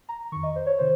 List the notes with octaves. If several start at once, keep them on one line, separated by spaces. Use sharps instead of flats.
A#5
F2 D#3 C#6
D#5
C5
C#5
C3 D#3 C5